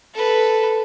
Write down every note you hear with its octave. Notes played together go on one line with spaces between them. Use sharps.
A4 B4